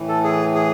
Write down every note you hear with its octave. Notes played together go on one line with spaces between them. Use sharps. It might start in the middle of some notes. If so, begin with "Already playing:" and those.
Already playing: A2 E3
A4
G#4
G#4